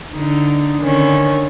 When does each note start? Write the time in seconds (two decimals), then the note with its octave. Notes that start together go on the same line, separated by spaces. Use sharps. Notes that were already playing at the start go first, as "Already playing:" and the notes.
0.13 D3 D#4
0.82 D3 D#3 C#4